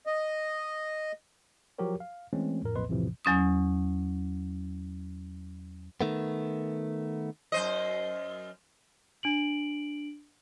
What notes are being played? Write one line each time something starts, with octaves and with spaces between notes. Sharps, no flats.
D#5
F3 F#3 F#4 G4 A#4 C#5
F5
E3 G#3 A3 C4 C#4
F2 A2 A#4
B1 F2 A#2 B4 D#5 C6
B1 F2 A2 C3 E3 F3
E2 F#3 C#4 D#6
D#3 A3 B3
F#2 C5 D#5
D4 D7 F#7